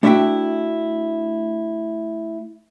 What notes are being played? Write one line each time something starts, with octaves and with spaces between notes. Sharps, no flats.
A3 D4 E4 F#4 E5 G5